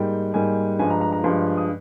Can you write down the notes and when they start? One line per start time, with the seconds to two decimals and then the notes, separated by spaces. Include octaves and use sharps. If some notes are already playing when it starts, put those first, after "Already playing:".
Already playing: G#2 G3 A#3 G5
0.34 G#2 G3 A#3 G#5
0.79 G2 F3 G#3 G#5
0.90 A#5
1.01 A#5
1.12 A#5
1.24 G2 F3 G#3 C6
1.57 D#6